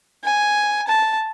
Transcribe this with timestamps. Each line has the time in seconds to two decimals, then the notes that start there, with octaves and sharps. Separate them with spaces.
0.24 G#5
0.88 A5